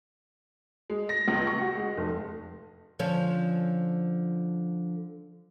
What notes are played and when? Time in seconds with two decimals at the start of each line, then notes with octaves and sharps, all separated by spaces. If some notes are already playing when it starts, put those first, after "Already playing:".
0.90 G#3
1.09 A#6
1.28 C#2
1.47 C#6
1.61 F#4
1.77 G#3
1.97 F1
2.99 D3 F3 C#4